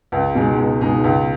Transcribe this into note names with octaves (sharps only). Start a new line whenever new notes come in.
C#2
B2 G#3 D#4 G#4
C#2
B2 G#3 D#4 G#4
C#2